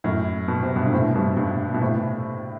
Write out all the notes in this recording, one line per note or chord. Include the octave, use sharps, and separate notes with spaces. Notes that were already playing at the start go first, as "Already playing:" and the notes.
F#2 A2
B2
C3
G2 B2
D3
A2 C3
G2 B2
G2 B2
B2
A2 C3